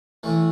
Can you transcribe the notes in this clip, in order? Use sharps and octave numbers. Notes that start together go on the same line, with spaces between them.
A2 E3 A3